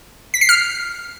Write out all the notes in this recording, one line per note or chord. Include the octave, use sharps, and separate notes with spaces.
B6
C7
F6